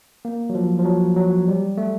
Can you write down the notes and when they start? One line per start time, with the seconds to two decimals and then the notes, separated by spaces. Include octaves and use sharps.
0.25 A#3
0.50 F#3
0.55 F3
0.79 F3
0.85 F#3
1.17 F#3
1.48 G3
1.78 A3